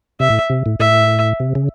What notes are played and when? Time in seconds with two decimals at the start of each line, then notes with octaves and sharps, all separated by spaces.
0.20 C3 E5
0.30 A2
0.50 C3
0.66 A2
0.80 A2 E5
1.40 C3
1.55 C#3